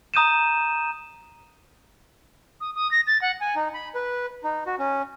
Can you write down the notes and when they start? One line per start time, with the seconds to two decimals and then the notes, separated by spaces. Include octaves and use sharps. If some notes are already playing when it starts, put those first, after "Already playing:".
0.14 A#5 D#6 G6 D#7 E7
2.61 D#6
2.75 D#6
2.91 A#6
3.07 A6
3.22 F#5
3.41 G#5
3.56 D#4
3.74 B5
3.95 B4
4.44 D#4
4.66 F#4
4.79 C#4